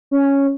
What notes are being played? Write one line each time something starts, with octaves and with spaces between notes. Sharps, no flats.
C#4